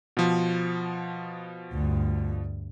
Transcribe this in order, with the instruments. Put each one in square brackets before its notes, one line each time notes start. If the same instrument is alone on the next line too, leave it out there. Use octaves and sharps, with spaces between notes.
[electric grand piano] B2 F3
[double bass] D2 G2